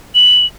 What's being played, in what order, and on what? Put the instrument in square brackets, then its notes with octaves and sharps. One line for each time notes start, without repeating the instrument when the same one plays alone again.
[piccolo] F#7